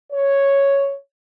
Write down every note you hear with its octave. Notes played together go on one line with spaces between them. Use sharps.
C#5